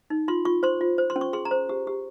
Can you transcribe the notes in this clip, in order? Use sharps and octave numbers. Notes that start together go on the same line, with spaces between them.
D#4
F4 C6
F4 C#6
C5 C6
F4
C5
C6
C#4
C#6
G#4 C6
A#5
C5
G4
G4